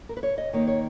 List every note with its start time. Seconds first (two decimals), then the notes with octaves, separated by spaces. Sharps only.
0.09 A#4
0.17 B4
0.23 C#5
0.38 D#5
0.53 D#3 A#3 D#4 C#5
0.67 C#5